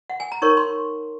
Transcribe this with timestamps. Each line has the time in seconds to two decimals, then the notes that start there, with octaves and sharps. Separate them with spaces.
0.10 F#5
0.20 G#5
0.32 A#5
0.42 D#4 A#4 C#5 C#6
0.57 C6